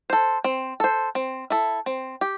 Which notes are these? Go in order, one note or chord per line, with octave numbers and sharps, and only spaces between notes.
A4 C5
C4
A4 C5
C4
E4 A4
C4
G4